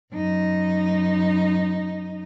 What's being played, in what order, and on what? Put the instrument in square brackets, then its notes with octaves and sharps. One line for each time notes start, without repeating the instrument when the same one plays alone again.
[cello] F#2 D#4